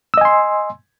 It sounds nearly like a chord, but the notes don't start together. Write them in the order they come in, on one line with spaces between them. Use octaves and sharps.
E6 D#5 G#5 C6